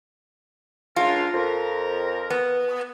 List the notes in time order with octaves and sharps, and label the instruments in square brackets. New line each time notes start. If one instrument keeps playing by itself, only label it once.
[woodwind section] C#2 D4 A#4 [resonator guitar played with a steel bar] F4
[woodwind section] F2 A#4 A#5
[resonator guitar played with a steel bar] B3